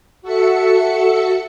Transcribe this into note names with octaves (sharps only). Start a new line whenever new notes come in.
F#4 A4 E5 C#7